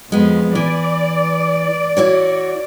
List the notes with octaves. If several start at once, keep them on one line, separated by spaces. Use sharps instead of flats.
F2 G#3 B3
E3 D5
E4 F#4 C#5